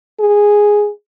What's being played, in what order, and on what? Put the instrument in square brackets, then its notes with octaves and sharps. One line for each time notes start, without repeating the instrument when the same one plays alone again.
[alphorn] G#4